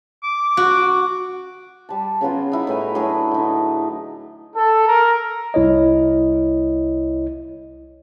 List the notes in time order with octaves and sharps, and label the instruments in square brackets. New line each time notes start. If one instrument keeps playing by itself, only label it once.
[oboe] D6
[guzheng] F#4
[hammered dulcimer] G3 A5
C#3 F#3 B3 F4
D#4 E4
A2 B4 G#5 A#5
A2 F#3 D4 G#4
D3 D#4
[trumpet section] A4
A#4
[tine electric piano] C2 E4 C#5 D#5